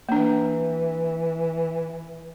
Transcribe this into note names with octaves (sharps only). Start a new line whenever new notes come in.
E3 A#3 D4